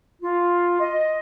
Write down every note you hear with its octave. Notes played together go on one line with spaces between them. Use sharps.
F4
D#5